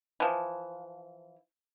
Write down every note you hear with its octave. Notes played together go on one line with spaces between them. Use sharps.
E3 F3